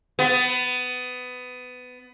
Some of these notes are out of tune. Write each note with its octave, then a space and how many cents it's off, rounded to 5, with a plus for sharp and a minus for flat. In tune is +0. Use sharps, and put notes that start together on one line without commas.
B3 +20